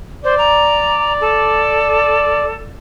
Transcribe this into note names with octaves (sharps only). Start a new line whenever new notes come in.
C5 D5
A#5
A4